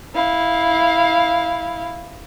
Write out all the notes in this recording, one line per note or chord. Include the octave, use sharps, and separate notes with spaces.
E4 F5